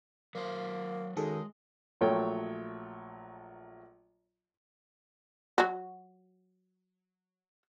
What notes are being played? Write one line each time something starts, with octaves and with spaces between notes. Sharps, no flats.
F#3 A#3 C5
F#2 D#3 G#3 G#4 A4
A#1 F#3 A3 C#5 G5
F#3 F#4